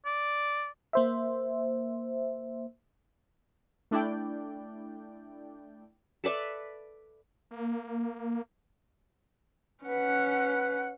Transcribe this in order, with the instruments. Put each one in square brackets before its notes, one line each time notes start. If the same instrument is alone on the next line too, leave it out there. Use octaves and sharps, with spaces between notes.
[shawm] D5
[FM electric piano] A#3 C5 E5
[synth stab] A3 D4 E4 D5 G5
[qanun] A4 B4 D5 E5
[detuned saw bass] A#3
[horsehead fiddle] C#4 F#5 [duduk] B4